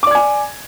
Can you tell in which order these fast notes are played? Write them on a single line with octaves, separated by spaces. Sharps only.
D6 D5 G#6 G#5